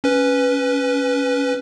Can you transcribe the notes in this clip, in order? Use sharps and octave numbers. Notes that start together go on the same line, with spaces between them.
C#4 B4